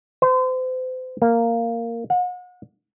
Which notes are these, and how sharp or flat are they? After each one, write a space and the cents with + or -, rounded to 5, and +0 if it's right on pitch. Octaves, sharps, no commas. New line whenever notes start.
C5 -35
A#3 -10
F#5 -40